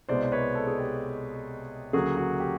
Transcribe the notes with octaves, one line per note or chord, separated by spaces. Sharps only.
C2 B2 G#3 B3 C5 D5
B4 C#5
A4
G#4
G4 A4
D2 C#3 F#3 A#3 F#4 G#4
F#4
G4